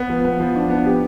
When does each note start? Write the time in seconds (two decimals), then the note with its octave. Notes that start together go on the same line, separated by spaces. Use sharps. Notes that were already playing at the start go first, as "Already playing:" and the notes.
Already playing: B3
0.10 F3
0.25 B3
0.40 F3
0.56 D4
0.70 B3
0.85 G4